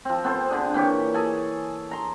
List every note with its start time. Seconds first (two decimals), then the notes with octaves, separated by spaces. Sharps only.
0.05 F3 C4
0.24 B3 C4 A4 C5
0.49 D3 D4 G#4
0.74 A#2 E3 G4 C#5
1.14 G#4 A4 G#5
1.91 A#5 C6